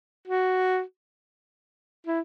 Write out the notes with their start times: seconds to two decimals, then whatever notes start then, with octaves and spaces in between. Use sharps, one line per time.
0.28 F#4
2.07 E4